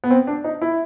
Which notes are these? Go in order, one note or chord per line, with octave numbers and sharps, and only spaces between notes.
B3
C4
D4
D#4
E4